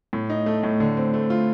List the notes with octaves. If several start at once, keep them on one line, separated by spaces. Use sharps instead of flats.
A2
D#4
A3
A2
D3
C4
A3
F4